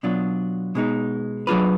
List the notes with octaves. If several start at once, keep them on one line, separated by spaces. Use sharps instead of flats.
B2 F#3 D4 F4
B2 G#3 D#4
F#3 D4 F4 G#4 B4